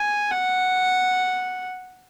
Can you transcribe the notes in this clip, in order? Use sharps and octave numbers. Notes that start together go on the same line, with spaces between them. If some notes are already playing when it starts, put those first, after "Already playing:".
Already playing: G#5
F#5